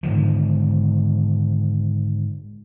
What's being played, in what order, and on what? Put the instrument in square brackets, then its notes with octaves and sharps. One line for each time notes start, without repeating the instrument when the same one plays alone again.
[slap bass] G#2 D3 D#3 F3